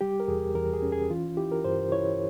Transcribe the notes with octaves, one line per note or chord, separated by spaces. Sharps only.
G3 G4
A#4
E2 G#4
E2 A#4
G#4
C#4
G#4
E3 F4
E4 G4
A#4
G2 C5
E4 C#5